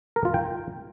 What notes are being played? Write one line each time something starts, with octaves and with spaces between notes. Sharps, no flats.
A#4
F4
G5